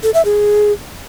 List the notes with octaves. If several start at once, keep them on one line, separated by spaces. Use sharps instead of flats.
A4
E5
G#4